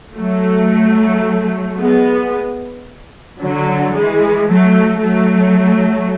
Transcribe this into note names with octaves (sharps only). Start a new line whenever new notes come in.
F#3 A3
G#3 B3
D3 F#3
E3 G#3
F#3 A3
F#3 A3